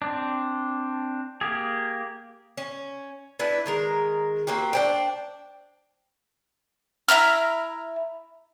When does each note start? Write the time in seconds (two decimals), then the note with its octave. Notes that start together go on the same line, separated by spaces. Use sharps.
0.02 C4 D4
1.41 A#3 G4 G#4
2.57 C#4
3.39 B3 D4 E4 B4
3.66 D#3 G#3 A#4
4.47 A#3 C4 F#4 G4
4.73 D4 C5 G5
7.08 E4 E5 A#5 F6